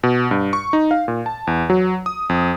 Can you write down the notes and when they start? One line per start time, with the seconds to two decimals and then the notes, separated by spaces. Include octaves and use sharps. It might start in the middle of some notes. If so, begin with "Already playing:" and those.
0.03 B2
0.31 G2
0.53 C#6
0.73 D#4
0.91 F5
1.08 A#2
1.26 A5
1.47 E2
1.70 F#3
2.06 D#6
2.29 F2